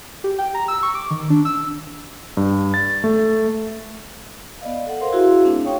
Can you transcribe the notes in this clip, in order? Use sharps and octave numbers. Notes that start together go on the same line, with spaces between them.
G4
G5
A#5
E6
C#6
D6
D#3
D4
E6
G2
A6
A3
B3 D5 D#5 F5
A4 F#5
A#4 C5 F5 C6
E4 F#4 G#4 E5 F5 A#5
A3 C4 D4
D#4 C#5 F5 G5 C#6